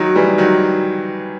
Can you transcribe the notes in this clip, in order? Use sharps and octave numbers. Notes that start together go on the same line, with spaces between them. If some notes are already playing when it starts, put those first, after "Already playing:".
Already playing: D#3 F#3
E3 G3
D#3 F#3